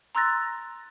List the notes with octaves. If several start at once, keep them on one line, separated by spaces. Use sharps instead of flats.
A#5 C6 E6 F#6 A6 A#6